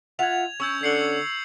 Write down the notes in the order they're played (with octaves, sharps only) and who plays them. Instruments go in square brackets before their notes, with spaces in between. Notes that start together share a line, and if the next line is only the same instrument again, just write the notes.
[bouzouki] F4 E5 F#5 [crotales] G#6 F7
[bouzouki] C#4 [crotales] C#6 E6 G6
[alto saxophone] D3 [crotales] C7 C#7 F#7